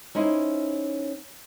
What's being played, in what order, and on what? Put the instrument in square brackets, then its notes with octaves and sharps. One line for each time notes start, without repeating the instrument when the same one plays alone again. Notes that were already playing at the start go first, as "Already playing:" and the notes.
[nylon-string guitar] C#4 D#4 E4 C5